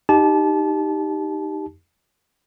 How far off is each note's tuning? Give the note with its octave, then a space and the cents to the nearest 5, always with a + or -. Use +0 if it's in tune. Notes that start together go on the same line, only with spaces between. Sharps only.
D#4 +0 G4 +0 A5 -25